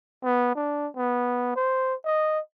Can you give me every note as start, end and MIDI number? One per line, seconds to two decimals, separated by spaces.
0.24 0.55 59
0.55 0.87 62
0.96 1.53 59
1.56 1.94 72
2.05 2.40 75